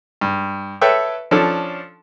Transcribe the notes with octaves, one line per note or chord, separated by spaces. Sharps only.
G2
A4 B4 C#5 E5 G5
F3 C#4 D4 A4